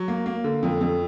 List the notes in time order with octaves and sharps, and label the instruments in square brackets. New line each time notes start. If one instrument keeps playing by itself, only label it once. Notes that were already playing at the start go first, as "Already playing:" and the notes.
Already playing: [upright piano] F#3
A#3
A#3
D3
F2
F2